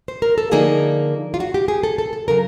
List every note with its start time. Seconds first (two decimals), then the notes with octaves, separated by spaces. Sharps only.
0.08 C5
0.22 A#4
0.38 A4
0.51 D3 F3 A#3 D#4 G#4
1.34 F4
1.40 F#4
1.54 G4
1.68 G#4
1.83 A4
1.98 A4
2.13 A4
2.28 C#3 F#3 A#4